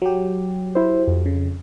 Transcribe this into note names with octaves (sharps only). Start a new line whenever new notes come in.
F#3 G4
E4 C5
F2
C#3